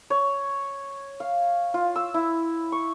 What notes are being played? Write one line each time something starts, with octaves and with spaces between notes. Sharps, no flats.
C#5
F5
F4
E6
E4
C#6